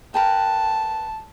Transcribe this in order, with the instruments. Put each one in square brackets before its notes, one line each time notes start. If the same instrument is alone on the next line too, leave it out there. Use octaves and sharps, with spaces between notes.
[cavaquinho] A#4 B4 G5 [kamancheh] A5